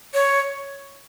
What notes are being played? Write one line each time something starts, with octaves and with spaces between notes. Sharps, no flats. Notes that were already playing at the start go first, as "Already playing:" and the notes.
C#5